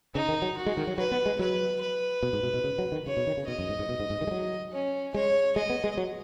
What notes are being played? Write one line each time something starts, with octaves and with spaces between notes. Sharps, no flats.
C#3 D#4
D#3
F#3
F#4
G#3
D#3
F#3
F#3 B4
B3
G#3
F#3 B4
B4
B2
G#2
B2
B2
C#3
F#3
D#3
C#3 C#5
B2
D#3
C#3
B2 D#5
F#2
G#2
G#2
B2
G#2
G#2
D#3
G#3
F#3
C#4
G#3 C#5
G#3 D#5
B3
G#3
F#3